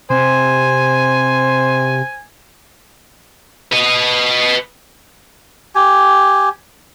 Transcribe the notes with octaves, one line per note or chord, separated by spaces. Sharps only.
C3 C5 G#5
B4 D#5
G4 G#5